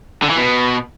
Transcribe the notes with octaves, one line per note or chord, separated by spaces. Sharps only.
D3
E3
B2